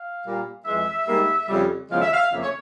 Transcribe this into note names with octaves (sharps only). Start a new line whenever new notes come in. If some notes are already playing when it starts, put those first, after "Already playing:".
Already playing: F5
A#2 G3 A#3
F2 E3 G#3 E5
G#2 G3 A#3
F2 C#3 G3
E2 C#3 F3 G#3 F5
E5
F5
F2 C#3 F3 A#3 E5
C#5